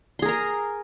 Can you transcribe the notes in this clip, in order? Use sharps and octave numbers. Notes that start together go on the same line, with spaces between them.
G#4 A#4 A#5 C6